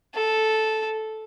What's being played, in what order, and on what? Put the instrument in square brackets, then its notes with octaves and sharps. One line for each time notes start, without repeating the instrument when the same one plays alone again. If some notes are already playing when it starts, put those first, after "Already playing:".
[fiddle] A4